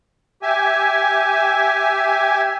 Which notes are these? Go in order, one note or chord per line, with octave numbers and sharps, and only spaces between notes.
G4 E5 G#5